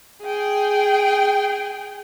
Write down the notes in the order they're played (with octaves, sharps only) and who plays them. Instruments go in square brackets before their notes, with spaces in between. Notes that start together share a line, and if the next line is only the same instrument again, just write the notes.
[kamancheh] G#4 G5